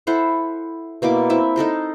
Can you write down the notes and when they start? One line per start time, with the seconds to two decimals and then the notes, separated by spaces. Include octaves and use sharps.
0.07 E4 A4 C5 F#5
1.02 B2 A#3 E4 D6
1.30 C4 E4 E5
1.56 D#4 A4 A#4 C5